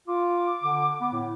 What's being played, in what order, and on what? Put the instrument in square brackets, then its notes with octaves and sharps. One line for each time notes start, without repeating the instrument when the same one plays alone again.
[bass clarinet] F4 [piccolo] D6
[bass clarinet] D3
B3
A2